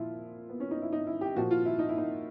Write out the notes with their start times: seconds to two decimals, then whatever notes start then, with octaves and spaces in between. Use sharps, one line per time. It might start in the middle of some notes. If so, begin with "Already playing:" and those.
Already playing: A#2 F3 E4 F4
0.49 B3
0.60 C#4
0.71 D#4
0.82 E4
0.92 D#4
1.07 E4
1.21 G4
1.36 A#2 F3 F#4
1.51 F4
1.65 E4
1.79 D#4
1.89 E4
1.98 D#4